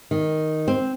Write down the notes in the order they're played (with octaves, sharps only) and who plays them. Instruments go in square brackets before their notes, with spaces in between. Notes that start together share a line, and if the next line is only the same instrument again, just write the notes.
[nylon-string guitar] D#3
C4